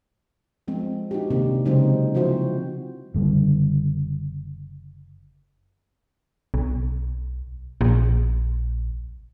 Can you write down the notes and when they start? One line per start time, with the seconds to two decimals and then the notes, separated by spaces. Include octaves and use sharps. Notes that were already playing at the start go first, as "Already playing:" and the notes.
0.68 F3 G#3 C4
1.11 D#4 F#4 G4
1.30 C3 D#3 A#3 C4 D4
1.66 C#3 F#3 G#3 C4 D#4 C5
2.15 F3 C4 E4 F#4 C5
3.14 F#1 D3 G3
6.54 B1
7.81 A#1